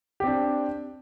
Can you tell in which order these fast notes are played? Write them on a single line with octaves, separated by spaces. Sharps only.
G4 C4 D4